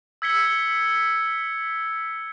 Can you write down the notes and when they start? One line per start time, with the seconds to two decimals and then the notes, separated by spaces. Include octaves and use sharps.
0.22 E6 G#6 B6 C#7 G7